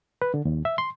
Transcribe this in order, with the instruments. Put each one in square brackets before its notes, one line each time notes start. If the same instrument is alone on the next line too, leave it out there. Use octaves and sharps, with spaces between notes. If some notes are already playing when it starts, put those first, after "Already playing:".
[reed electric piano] B4
D3
D#2
E5
C6